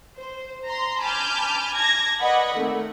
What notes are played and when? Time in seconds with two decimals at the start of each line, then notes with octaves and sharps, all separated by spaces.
0.17 C5
0.65 A#5 C6
1.01 G#5 A5 B5 D6 F6 G6
1.74 A5 D6 G#6 A#6
2.20 B4 D5 D#5 F#5 B5
2.55 D#3 A3 C4